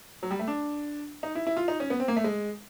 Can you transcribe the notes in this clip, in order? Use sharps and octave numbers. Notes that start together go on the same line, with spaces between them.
F#3
G3
A3
D4
D#4
E4
E4
F4
D#4
C#4
B3
C4
A#3
A3
G#3